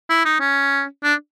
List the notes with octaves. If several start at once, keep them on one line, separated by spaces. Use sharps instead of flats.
E4
D#4
C#4
D4